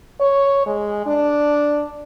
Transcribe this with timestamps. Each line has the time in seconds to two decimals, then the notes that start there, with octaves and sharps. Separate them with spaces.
0.20 C#5
0.66 G#3
1.06 D4